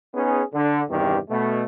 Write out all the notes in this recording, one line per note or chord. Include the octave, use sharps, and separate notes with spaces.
B3 C#4 D#4 G#4
D3
E2 G2 C3 D#3 G4
B2 A3